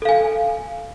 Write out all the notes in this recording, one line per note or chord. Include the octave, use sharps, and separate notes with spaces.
A4 F5 G#5